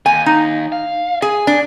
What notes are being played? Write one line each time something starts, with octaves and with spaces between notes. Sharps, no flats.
D#2 G#5
D#4
F5
G#4 G#5
D4